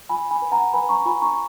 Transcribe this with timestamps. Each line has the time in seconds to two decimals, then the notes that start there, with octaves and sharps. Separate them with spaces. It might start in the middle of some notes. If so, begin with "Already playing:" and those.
0.09 F4 G#5 B5
0.31 G#5 B5
0.42 B4
0.52 F#5 A#5
0.74 B4 G#5 B5
0.89 A#5 C#6
1.05 F4 G#5 B5
1.22 A#5 C#6